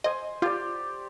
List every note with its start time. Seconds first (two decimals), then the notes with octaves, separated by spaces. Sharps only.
0.04 C5 D#5 G#5
0.42 F4 G4 D5